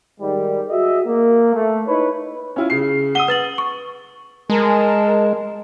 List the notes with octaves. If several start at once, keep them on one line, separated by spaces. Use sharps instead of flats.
G#2 D#3 G3
F#4 G#4 D#5 E5
A#3
A3
D#4 E4 B4 C#5
C#4 E4 F4
C#3 C7
F#5 D#6 D#7 G7
B4 A6 F#7
C#6
G#3 A#4 A5